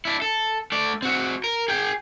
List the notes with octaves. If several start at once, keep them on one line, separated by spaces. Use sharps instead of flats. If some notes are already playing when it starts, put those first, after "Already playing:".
D4 E4
A4
A3 D5
C4 F#4
A#4
G#4 G5